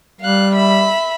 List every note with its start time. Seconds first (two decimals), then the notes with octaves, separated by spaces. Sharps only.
0.21 G3 F5 F#6
0.55 E5 B5